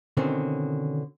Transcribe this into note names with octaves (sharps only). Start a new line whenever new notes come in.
B2 D3 D#3 C4 C#4